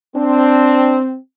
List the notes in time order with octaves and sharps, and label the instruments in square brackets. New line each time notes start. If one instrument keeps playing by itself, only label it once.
[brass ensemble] C4 [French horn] D4